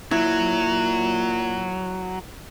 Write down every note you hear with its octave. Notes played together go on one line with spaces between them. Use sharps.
A#2 F#3 E4